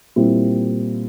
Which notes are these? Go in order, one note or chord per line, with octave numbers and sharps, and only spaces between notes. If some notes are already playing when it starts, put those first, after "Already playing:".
A#2 G3 C4 E4